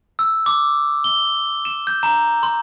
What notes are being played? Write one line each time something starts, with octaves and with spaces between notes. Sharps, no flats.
E6
D6
G7
E7
G6
A#5
C6